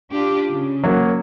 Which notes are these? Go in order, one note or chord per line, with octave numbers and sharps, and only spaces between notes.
D4 F4 G4
C#3
F#3 A#3